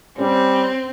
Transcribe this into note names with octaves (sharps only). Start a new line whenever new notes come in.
G3 C4 C#4